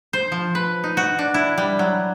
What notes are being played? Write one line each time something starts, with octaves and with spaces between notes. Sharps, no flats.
C5
F3
B4
D#4
F#4
D4
E4
G3
F#3